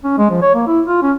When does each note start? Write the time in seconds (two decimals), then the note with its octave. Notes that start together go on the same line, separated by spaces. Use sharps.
0.04 C#4
0.18 G#3
0.30 F3
0.42 C#5
0.55 A#3
0.67 E4
0.86 F4
1.02 C#4